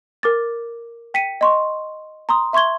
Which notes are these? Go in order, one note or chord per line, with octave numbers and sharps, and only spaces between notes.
A#4 D6 A6
G5 B6 C#7 D#7
D#5 C6 C#6
A#5 C6 D#6
E5 C6 C#6 G#6 G7